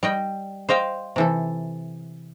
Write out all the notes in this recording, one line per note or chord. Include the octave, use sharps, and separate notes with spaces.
G3 D#5 G5
C5 D#5 F5 G5
C3 E3 A4